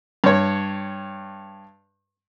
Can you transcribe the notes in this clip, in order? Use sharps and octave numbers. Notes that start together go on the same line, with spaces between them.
G2 C#5